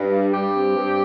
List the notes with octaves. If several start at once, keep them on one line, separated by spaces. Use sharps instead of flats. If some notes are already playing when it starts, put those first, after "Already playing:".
Already playing: G2
G3
G2 G4
C4
G2